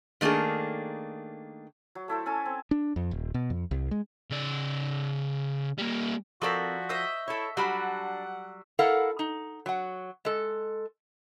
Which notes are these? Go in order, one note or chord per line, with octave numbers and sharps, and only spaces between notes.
D#3 A3 A#3 D4 G#4
F#3
A3 E4 A4 C5
C#4 A4 G#5 A5
C4
D4
F2
D#1
B2
F2
C2
G#3
C#3 D5
G3 A#3
F3 C4 F#4 A4 A#4 D5 C#6 B6
C5 D#5 E5 E6
E4 A4 C#5
F#3 G3 D4 F#4 F#5 B5 F6
E4 A4 A#4 F5 F#5
D#4
F#3 F#5
G#3 A4